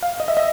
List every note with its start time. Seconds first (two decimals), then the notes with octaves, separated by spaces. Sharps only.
0.03 F5
0.20 D#5
0.28 E5
0.37 D#5